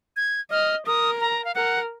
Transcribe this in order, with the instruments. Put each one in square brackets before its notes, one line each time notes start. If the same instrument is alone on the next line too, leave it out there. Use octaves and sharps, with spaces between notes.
[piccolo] G#6
[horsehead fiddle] D#5 [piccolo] F6
[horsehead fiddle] A#4 [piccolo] D#6
[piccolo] A#5
F5
[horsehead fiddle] A#4 [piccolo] F#5